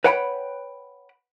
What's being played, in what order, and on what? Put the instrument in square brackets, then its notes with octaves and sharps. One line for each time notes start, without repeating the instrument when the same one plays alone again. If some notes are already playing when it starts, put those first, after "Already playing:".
[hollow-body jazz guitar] B4 C#5 F#5 G5 A5 B5